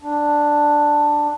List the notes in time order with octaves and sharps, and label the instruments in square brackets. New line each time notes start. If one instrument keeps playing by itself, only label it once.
[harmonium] D4